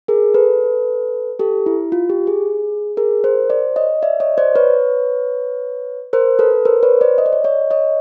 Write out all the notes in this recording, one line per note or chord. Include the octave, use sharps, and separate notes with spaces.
G#4 A#4
A4 B4
G4 A4
E4
F4
G4
G#4
G#4 A#4
A#4 C5
C5 D5
C#5 D#5
D5 E5
C#5 D#5
C5 D5
B4 C#5
A#4 C5
A4 B4
A#4 C5
B4 C#5
C5 D5
D#5
D5
C#5 D#5
C#5 D#5
C#5 D#5